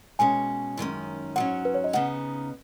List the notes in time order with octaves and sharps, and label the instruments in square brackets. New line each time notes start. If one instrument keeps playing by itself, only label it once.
[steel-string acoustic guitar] B2 G#3 C#4 [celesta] G#5
[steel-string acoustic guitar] F#2 D#3 G#3 C#4
[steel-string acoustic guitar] G#2 F#3 C#4 [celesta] F#5
[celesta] B4
C#5
D#5
[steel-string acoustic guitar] C#3 B3 D#4 [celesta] F#5